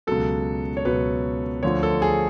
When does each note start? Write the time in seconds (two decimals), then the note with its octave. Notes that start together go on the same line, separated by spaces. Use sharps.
0.07 C#2 B2 F#3 A4
0.77 C#5
0.85 C#2 B2 F#3 B4
1.63 D2 D3 F3 C#5
1.83 A4
2.02 G#4